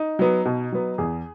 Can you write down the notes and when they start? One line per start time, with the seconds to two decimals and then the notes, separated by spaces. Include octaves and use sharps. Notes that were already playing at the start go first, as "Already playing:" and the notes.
Already playing: D#4
0.19 F#3 B3
0.45 B2
0.72 F#3 B3
0.98 E2 G#4